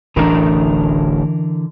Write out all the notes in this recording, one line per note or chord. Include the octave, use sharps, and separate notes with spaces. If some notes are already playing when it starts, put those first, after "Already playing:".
D1 A1 D3 E3 D4 A#4